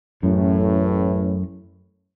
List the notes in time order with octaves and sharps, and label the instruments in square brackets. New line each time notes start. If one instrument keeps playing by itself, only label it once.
[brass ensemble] A1 A2 [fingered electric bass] F#2